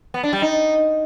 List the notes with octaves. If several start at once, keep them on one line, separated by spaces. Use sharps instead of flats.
B3
D4
G3
D#4